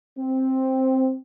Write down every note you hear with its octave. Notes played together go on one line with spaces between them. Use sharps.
C4